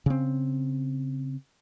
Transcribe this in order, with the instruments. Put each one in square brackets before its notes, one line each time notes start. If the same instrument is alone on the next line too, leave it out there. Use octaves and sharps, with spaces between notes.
[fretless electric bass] C#3 C4